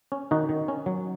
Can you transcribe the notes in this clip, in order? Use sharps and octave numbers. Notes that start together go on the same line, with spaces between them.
C#4
D#3 D#4 F#4
D#3
C#4
F#3